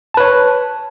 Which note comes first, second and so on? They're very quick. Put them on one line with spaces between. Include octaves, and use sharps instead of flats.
A5 B4 C#5